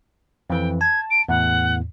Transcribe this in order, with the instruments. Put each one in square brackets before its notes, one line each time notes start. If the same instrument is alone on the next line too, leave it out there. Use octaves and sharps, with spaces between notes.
[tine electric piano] F2 E3 [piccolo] G5
[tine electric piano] A5 [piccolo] G#6
[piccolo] D7
[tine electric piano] E2 A2 [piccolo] F#5